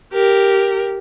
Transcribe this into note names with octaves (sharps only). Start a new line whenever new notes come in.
G4 A#4